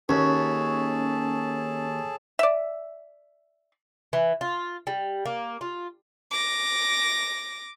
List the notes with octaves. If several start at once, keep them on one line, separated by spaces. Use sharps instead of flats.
D#2 C#4 G#4 A4 C#5 A5
D5 E5
E3
F4
G3
A#3
F4
D6 A#6